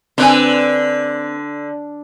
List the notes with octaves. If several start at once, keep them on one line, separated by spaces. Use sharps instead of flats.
D3 C4 B4 G#5